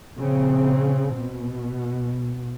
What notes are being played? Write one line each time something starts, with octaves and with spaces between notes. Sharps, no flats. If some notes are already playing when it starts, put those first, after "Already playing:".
A#1 C#3 C4
B2